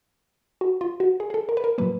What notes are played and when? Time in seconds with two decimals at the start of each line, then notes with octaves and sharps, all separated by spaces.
0.61 F#4
0.81 F4
1.00 F#4
1.20 G#4
1.30 G#4
1.34 A4
1.49 A#4
1.57 B4
1.64 A#4
1.78 A2 F#3 A#3 B4